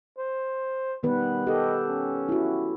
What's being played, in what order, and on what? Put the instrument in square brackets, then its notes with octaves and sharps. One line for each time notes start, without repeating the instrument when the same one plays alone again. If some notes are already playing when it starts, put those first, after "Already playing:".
[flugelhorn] C5
[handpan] D#3 B3 B4 [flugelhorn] G3
[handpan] G4 A4 [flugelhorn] D#5
[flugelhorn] C#4
[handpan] E4 F#4